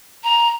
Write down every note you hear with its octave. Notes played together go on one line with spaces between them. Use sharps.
A#5